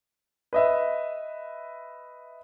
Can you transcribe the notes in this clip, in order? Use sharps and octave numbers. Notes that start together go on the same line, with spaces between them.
B4 D#5 E5